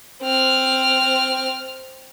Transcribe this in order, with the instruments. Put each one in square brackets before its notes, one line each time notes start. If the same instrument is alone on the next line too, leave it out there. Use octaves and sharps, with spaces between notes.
[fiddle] C4 F6